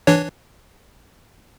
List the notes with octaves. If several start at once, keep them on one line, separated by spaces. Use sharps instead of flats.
E3 D4 C#5